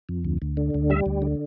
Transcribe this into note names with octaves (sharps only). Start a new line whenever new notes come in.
F2
D2
D2
D3
D2
G3 E5
D2
D3